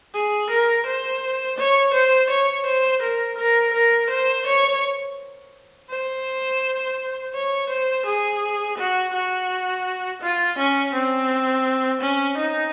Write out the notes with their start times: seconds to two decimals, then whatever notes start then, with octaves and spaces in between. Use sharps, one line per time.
0.14 G#4
0.50 A#4
0.86 C5
1.58 C#5
1.94 C5
2.30 C#5
2.66 C5
3.02 A#4
3.38 A#4
3.73 A#4
4.10 C5
4.46 C#5
5.90 C5
7.34 C#5
7.70 C5
8.06 G#4
8.78 F#4
9.13 F#4
10.22 F4
10.58 C#4
10.94 C4
12.01 C#4
12.38 D#4